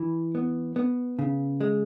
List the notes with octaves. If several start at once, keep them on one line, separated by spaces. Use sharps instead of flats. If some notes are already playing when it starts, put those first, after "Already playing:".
Already playing: E3
B3
B3
C#3
G#3